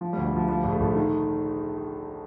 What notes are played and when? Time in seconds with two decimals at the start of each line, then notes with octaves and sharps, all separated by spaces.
0.01 F3
0.13 G3
0.17 D2
0.25 G3
0.32 D2 F3
0.48 F3 G3
0.64 A#1
0.72 A3
0.80 A#1
0.96 D#3